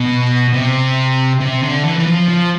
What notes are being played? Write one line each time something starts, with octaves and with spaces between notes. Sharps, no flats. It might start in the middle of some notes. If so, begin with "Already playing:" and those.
Already playing: B2
C3
C3
D3
E3
E3
F3
F3